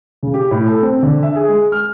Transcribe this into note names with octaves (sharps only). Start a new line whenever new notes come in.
C#3
G4
A2
A4
C4
D3
E5
G#4
G#3
F6